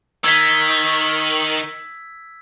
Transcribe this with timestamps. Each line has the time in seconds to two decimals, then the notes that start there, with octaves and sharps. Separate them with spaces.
0.24 D#3 E6 G#6 B6